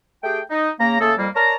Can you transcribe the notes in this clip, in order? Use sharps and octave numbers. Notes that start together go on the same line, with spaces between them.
A3 G4 G#4 G5
D#4
C#3 A#3 A#5
C#3 A3 A#3 G#4 A4
F2 G3 A#3
A#4 C#5 D5 A5 A#5